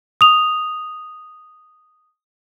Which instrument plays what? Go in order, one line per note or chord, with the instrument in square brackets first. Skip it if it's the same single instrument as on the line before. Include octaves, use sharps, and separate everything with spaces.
[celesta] D#6 F7